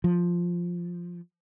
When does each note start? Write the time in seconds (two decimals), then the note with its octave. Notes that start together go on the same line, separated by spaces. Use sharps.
0.04 F3